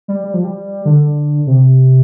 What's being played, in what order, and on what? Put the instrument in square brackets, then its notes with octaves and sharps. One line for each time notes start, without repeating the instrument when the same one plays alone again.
[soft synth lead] G3
G3
F3
G3
D3
C3